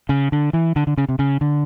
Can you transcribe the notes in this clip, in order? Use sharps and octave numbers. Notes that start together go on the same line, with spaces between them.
C#3
D3
E3
D3
D3
C#3
C3
C#3
D3